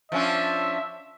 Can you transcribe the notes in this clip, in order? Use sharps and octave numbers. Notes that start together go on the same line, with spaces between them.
F3 C#4 D4 E5